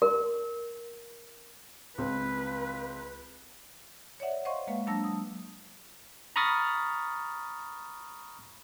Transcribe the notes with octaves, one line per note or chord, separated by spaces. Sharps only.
A#4
C#2 C4 B4
C#5 D5 E5 F#5
C5 D#5 F5 F#5 C6 C#6
G#3 A#3 B4 F5
F#3 A#3 D4 A5 E6 A#6
D#6
A#5 B5 C#6 D#6 F6 A6